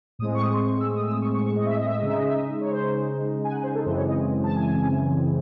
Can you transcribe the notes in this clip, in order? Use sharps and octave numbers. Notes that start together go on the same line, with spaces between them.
A2 G#3 C4 D#6
C#6
D#6
C6
C#6
E6
D#6
E6
D#6
C#6
C#6
C#6
D#5
E5
D#5
E5
D#5
C#3 G#3 D#4 E5
D#5
E5
D#5
C#5
C5
G#5
F#5
C5
A4
F#2 C#3 E3 G#3 C4 C5
C#5
D#5
A5
G#5